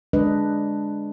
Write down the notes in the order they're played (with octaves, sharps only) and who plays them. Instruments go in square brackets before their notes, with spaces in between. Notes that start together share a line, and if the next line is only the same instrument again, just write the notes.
[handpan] G#3 D4 B4 D#5